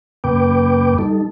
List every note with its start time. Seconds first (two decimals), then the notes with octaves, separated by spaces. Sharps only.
0.24 F#2 C#3 A#3 B4 G5 D6
0.99 G3 D#4 A4